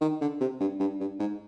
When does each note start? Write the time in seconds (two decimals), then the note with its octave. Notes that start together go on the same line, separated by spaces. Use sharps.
0.01 D#3
0.21 D3
0.41 C3
0.60 G2
0.80 G2
1.00 G2
1.19 G#2